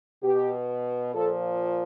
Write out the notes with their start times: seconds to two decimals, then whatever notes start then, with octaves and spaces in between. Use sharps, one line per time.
0.23 B2 G4
1.13 A#2 F3 A4